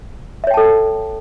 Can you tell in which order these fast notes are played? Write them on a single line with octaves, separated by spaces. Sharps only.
E5 C#5 G5 A5 A4